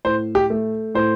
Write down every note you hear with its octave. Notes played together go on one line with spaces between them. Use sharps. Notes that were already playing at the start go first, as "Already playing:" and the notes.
A2 C5
G4
A3
A2 C5